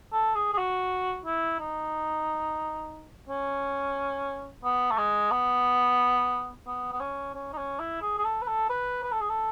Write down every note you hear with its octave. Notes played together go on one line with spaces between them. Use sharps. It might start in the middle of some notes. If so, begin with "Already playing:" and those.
A4
G#4
G#4
F#4
E4
D#4
C#4
B3
A3
G#3
B3
B3
B3
C#4
C#4
D#4
C#4
E4
G#4
G#4
A4
B4
A4
B4
B4
A4
G#4
A4